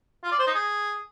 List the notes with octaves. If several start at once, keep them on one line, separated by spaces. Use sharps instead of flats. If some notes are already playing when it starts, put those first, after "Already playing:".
F4
D5
C5
D#4
G#4